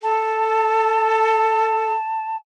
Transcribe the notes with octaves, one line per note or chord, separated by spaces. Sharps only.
A4 A5